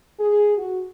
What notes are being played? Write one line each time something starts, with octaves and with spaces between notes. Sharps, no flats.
G#4
F#4